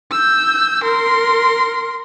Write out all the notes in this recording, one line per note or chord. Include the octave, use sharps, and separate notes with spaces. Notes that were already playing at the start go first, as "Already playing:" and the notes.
E6 G6
A#4 C6